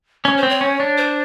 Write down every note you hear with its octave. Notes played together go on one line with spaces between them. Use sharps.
C#4 C#5
C5
C4
C#5
C#4
D4
C5